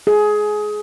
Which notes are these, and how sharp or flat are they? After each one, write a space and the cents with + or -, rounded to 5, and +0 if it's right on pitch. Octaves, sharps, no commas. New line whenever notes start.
G#4 +20